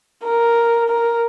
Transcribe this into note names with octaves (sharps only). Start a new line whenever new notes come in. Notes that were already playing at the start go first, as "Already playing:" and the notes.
A#4
A#4